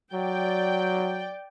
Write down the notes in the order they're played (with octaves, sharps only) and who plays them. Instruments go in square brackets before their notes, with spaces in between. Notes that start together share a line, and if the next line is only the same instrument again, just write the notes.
[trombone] F#3 [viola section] D5 G5